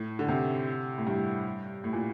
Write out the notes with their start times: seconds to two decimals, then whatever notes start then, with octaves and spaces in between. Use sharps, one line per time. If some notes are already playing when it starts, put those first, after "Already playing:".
Already playing: A2
0.19 D3
0.28 C3
0.98 A2
1.07 G2
1.84 A2
1.93 A#2